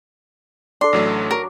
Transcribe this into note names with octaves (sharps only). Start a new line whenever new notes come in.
D4 A4 D5 C6
A1 F#3 A3 D4
F#3 A#4